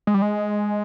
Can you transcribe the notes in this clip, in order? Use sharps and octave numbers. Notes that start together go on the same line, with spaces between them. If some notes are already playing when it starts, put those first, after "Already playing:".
G#3
G3
G#3